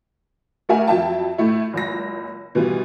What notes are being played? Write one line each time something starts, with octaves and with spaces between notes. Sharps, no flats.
A3 G4 A#4 E5 F#5 G#5
F2 F#3 E5 G5 A5
A2 A3 E4
F#1 C#2 A#6
B2 E3 G3 F4